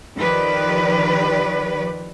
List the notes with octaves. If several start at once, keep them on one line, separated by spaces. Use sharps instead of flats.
D#3 F3 G4 B4 D5